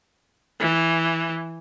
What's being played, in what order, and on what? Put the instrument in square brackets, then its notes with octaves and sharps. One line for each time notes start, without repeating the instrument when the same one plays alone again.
[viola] E3